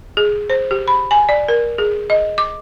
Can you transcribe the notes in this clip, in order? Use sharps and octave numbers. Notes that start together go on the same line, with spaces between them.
G#4
C5
G4
B5
G#5
D5
A#4
G#4
D#5
D6